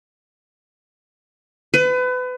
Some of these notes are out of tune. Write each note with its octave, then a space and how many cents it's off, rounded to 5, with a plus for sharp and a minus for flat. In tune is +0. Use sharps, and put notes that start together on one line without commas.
B4 +30